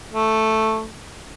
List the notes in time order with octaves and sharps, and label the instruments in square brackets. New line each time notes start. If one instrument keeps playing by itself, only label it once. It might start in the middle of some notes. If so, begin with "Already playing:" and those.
[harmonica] A3